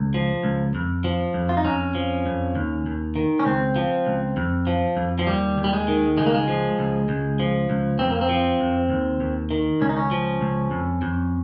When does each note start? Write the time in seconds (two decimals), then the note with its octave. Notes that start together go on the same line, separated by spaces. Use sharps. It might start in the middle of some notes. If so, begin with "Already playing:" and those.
Already playing: C#2
0.14 F3
0.43 C#2
0.75 F2
1.04 F3
1.34 F2
1.49 F4
1.57 D#4
1.65 F2 C#4
1.95 F3
2.26 F2
2.55 D#2
2.86 D#2
3.16 D#3
3.40 C#4
3.45 C#2 C4
3.76 F3
4.07 C#2
4.37 F2
4.67 F3
4.97 F2
5.19 F3
5.27 D#2 G3
5.58 D#2
5.64 G3
5.73 G#3
5.88 D#3
6.18 C#2 G#3
6.26 A#3
6.34 G#3
6.48 F3
6.79 C#2
7.09 C#2
7.39 F3
7.70 C#2
7.99 F2 C4
8.10 A#3
8.21 C4
8.29 F3
8.60 F2
8.89 D#2
9.20 D#2
9.51 D#3
9.81 C#2 C#4
9.89 D#4
9.97 C#4
10.11 F3
10.41 C#2
10.71 F2
11.02 F2